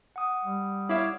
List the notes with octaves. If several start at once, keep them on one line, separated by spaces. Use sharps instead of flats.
F#5 D#6
G3
E4 C#5 E5 F5 D6